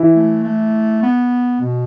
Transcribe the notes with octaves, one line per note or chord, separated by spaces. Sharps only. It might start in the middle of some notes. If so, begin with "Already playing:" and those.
Already playing: E3 E4
A3
A3
B3
B2